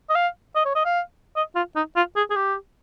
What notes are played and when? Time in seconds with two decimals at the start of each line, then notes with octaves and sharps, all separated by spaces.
0.10 D#5
0.15 F5
0.56 D#5
0.65 C#5
0.75 D#5
0.85 F5
1.36 D#5
1.56 F4
1.76 D#4
1.96 F4
2.16 G#4
2.30 G#4
2.36 G4